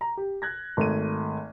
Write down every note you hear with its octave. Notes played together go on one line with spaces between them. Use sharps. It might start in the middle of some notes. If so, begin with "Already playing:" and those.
A#5
G4
F#6 G#6 A#6
G#1 A3 D#7